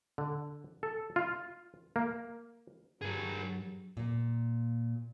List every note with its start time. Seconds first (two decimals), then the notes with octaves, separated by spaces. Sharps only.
0.18 D3
0.83 A4
1.16 F4
1.96 A#3
3.02 G2 F#3 G#4 A#4
3.97 A#2 A#3